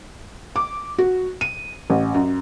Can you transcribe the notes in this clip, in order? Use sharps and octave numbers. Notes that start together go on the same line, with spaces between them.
D6
F#4
D#7
A1
F#2